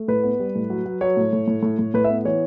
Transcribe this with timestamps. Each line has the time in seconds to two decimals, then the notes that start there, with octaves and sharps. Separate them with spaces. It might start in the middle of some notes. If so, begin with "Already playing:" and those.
Already playing: A3
0.08 A2 B4
0.23 B3
0.39 G3
0.55 A2
0.70 F#3
0.86 F#3
1.01 F#3 C#5
1.17 A2
1.33 A2
1.48 A2
1.63 A2
1.79 A2
1.94 A2 B4
2.04 B3 E5
2.25 E3 C#5